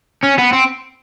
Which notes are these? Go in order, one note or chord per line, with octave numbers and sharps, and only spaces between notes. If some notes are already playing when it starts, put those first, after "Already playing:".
C#4
B3
C4